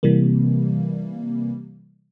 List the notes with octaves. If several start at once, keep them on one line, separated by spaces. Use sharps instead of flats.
C3 E3 G3 A#3